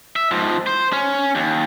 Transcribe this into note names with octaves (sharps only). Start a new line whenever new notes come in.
E5
G#2 F3
C5
C#4
D#2